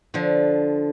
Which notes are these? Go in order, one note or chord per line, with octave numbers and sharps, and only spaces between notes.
D3 F3